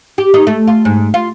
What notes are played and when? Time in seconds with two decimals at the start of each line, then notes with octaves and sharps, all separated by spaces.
0.18 G4
0.34 D#4
0.47 A3
0.68 F4
0.85 G#2
1.14 F4